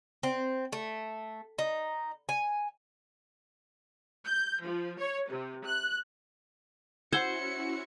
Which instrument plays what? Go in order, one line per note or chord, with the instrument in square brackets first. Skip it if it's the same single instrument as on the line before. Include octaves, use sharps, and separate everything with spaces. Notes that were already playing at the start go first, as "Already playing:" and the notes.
[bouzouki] C4
A3
D#4
G#5
[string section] G6
F3
C#5
C3
F#6
[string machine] C#4 E4 F#4 [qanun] C5 [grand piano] F#5 E6 G#6 [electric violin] C#7